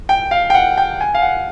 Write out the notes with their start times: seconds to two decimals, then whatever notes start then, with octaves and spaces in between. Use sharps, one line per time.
0.09 G5
0.31 F5
0.50 G5
0.54 F#5
0.78 G5
1.01 G#5
1.15 F5
1.22 F#5